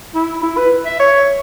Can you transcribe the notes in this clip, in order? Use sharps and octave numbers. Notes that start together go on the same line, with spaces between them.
E4
E4
B4
E5
C#5